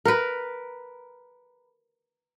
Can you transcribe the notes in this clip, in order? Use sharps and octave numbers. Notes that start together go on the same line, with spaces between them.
A#4 B4